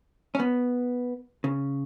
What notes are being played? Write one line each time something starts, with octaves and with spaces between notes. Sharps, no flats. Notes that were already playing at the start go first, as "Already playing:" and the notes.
C#4
B3
C#3